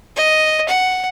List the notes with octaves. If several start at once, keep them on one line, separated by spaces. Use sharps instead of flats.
D#5
F#5